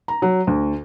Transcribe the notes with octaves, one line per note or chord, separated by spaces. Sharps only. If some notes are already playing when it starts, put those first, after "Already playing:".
A#5
F#3
D2